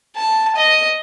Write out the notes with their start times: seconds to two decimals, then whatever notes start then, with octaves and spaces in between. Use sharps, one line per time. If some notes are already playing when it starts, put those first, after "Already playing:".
0.16 A5
0.56 D#5